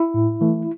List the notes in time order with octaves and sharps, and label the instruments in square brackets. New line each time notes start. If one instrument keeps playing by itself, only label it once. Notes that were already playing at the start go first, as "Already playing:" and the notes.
Already playing: [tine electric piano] E4
A2
E3 A3